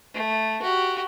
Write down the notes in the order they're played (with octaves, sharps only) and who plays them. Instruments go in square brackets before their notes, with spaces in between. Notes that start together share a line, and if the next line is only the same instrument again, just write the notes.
[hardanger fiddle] A3
F#4 G4